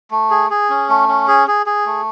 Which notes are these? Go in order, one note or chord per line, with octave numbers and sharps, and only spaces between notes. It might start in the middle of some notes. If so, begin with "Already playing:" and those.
A3
G#4
G#4
C#4
A3
C#4
G#4
G#4
G#4
A3